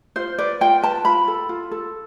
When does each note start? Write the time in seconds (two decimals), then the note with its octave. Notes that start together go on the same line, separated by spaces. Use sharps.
0.16 F4 C5
0.38 B4 D5
0.61 F4 G5
0.82 B4 A5
1.05 F4 B5
1.28 A4
1.49 F4
1.71 A4